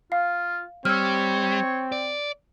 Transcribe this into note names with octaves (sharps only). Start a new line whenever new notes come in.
F4 F5
G3 C4 C#5 E6 F6
D5